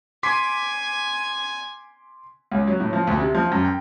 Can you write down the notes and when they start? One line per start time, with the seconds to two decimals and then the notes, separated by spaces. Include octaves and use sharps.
0.23 G#5 C6 D6 B6
2.52 C#2
2.67 F#3
2.80 A2
2.93 F3
3.07 D2
3.20 C3
3.35 F3
3.52 F#2
3.65 G5